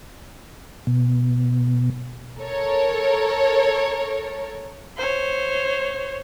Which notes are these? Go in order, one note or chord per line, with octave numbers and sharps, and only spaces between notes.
B2
A4 A#4 C#5
C5 C#5